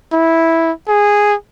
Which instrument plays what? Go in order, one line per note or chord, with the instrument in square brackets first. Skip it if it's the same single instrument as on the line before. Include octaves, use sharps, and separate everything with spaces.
[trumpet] E4
G#4